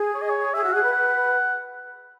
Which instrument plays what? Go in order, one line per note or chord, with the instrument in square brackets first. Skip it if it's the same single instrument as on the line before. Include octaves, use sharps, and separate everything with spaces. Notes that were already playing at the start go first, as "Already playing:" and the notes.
Already playing: [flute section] G#4
[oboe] C#5
D#5
C#5
[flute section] G#4 [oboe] E5
[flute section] F#4
[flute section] G#4 [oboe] F#5
[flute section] B4
[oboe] F#5